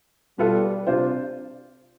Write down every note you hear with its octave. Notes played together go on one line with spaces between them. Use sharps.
B2 G3 B3 F4 A4
C3 D4 F4 C5